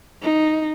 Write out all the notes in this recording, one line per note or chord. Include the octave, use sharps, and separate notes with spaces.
D#4